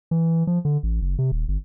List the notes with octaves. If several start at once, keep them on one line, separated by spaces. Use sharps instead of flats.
E3
F3
D3
A1
F#1
C3
D#1
G1